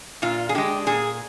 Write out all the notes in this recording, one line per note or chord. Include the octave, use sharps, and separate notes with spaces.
A#2 F4
G#4
G#3 D4 G4
A#2 G#4